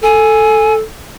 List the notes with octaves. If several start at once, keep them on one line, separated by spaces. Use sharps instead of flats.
A4 G#5